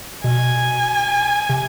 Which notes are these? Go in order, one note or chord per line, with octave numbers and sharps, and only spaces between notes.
B2 G#5
C3